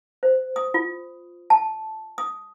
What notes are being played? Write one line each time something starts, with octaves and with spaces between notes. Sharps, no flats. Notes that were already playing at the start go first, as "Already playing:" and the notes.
C5
D#6
F4
A5
D#6